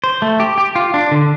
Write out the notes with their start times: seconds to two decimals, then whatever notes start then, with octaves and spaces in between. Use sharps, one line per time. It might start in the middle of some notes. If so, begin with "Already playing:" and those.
0.04 C5
0.22 A3
0.40 G4
0.58 G4
0.76 F4
0.94 D4
1.11 D3